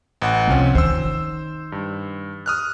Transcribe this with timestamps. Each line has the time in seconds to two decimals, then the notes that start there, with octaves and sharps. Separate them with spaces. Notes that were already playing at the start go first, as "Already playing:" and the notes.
0.22 A1 F#5
0.48 C2 F3 C4 C#4
0.75 D#3 C5 E6
1.72 G2
2.46 D#6 F6 F#6